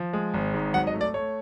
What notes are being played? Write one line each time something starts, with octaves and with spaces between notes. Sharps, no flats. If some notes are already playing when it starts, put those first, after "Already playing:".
Already playing: F3
G#3
G#1
G#2
F#3 F#5
D#5
A3
D5
A3 C#5